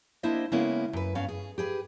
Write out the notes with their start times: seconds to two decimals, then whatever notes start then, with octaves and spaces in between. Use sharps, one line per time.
0.23 A#3 D4 E4 C5 D#5 E5
0.52 C#3 G#3 A#3 B3 C#4 E4
0.93 F#2 B4
1.15 G2 B3 C#4 F5
1.29 G#4
1.58 G4 G#4 B4